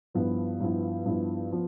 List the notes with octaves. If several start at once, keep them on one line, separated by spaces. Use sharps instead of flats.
G2 F3 B3 E4
G2 F3 B3 E4
G2 F3 B3 E4
F3 B3